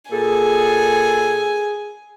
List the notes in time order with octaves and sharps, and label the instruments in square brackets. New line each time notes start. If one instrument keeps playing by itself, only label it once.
[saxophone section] A#2 A4 [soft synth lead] G#4 [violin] G#5